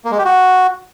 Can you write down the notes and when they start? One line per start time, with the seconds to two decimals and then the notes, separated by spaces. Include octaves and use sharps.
0.05 A#3
0.11 G#3
0.18 G4
0.25 F#4